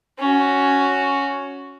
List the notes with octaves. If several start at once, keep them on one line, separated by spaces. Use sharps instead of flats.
C#4 F#4